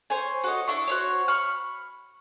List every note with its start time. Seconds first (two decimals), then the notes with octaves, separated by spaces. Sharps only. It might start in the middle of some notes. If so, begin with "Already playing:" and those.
0.10 C5 C#5 G#5
0.44 F#4 A4 D#5
0.68 D4 E4 C#6
0.88 F#4 C5 C#5
1.28 B5 C#6 F6